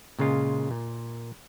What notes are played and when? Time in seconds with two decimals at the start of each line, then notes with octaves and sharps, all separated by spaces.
0.19 A#2 C#3 G#3 F4
0.71 A#2